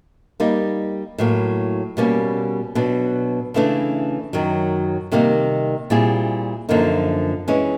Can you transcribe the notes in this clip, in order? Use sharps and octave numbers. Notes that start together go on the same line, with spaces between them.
G3 A#3 D#4
A2 F#3 A#3
B2 G3 A#3 C#4
B2 F#3 B3 D4
C#3 E3 A3 D4
F#2 D#3 F#3
C3 D#3 G3 A#3 D#4
A#2 G3 C4 E4 G#4
F#2 D3 F3 A#3 D#4
E3 G#3 C#4